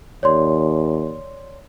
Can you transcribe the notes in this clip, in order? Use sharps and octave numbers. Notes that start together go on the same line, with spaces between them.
D#2 C#5 D5 C6